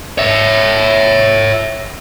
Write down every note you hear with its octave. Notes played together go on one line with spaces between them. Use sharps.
C#5 E5